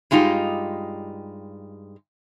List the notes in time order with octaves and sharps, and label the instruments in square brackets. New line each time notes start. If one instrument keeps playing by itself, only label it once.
[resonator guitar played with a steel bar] G2 G#3 D#4 F4 G4